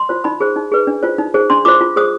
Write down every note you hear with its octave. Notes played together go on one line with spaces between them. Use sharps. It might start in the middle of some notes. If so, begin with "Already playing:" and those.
Already playing: C6
F4 C5
D#4 B5
G#4 C5
D#4
G#4 B4
D4
F4 C5
D#4
G#4 C5
D4 C6
F4 C5 D6
F4
G#4 C5 D#6